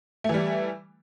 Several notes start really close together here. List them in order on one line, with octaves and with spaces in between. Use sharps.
A3 E3 G3